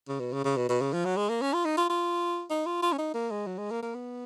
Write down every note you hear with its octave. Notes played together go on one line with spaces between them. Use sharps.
C#3
B2
C#3
C#3
B2
B2
C#3
F3
F#3
G#3
A#3
C#4
F4
D#4
F4
F4
D#4
F4
F4
C#4
D#4
A#3
G#3
F#3
G#3
A#3
A#3
B3